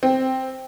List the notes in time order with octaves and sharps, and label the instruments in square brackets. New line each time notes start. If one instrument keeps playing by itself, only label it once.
[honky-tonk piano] C4